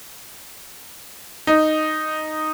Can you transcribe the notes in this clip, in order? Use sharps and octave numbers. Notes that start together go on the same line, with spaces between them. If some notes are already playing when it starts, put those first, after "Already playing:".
D#4